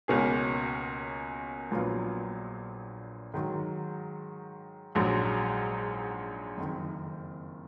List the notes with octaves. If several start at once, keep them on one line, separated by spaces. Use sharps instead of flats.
C#2 B2 A#3 C#4 G#4
A#1 A#2 F#3 B3 F4
G#2 D#3 F#3
A#1 G#2 F#3
F#1 F2 D#3